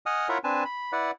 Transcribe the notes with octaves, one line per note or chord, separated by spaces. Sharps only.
D#5 F#5 G#5 D#6 F6
E4 F4 A#4 C#5 E5 F#5
C4 D4 B4 G#5 A5
B5
E4 B4 D5 F#5